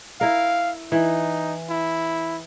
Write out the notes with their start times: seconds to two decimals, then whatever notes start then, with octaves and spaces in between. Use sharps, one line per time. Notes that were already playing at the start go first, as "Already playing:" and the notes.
0.21 E4 A#4 F5
0.92 E3 D#4
1.70 E4